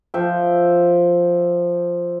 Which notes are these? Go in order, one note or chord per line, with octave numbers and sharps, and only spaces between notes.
F3 E5 G5